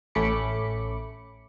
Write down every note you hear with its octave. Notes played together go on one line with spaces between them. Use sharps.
A1 A3 C#4 B5 D6 C#7